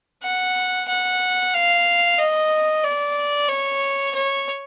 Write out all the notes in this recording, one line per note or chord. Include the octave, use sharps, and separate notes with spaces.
F#5
F#5
F5
D#5
D5
C#5
C#5